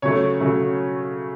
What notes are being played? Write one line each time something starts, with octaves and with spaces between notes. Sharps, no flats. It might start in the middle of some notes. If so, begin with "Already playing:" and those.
C#3 F#3 A3 C#5
C#3 F#3 A3